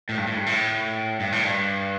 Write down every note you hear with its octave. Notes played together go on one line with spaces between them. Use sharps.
A2
G2
A2
G2
A2
G2
A2
G2